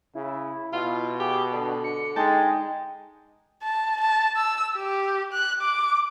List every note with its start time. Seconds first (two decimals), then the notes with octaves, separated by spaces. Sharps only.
0.15 C#3 E4
0.73 B2 F4
1.20 G4 G#4
1.53 D3 D4
1.84 C#7
2.16 G#3 D#4 G5 A5
3.64 A5
4.01 A5
4.36 E6
4.77 G4
5.33 F#6
5.61 D6